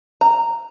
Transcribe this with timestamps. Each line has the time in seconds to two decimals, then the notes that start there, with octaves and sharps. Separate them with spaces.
0.21 A#5